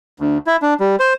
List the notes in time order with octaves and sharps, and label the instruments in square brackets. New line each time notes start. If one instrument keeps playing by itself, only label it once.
[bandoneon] D2
E4
D4
G3
C5